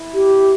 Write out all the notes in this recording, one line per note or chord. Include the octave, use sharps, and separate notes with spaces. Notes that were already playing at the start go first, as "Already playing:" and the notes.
Already playing: E4
G4